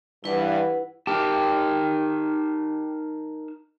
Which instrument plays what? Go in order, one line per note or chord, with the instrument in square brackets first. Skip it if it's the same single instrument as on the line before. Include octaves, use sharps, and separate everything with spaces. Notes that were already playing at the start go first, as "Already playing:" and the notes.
[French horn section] G2 E3 [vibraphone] E4 B4 F#5
[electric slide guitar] D#4 A#4 A5 [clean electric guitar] G4